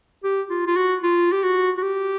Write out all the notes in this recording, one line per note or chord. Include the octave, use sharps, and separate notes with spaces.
G4
F4
F4
F#4
F4
G4
F#4
F#4
G4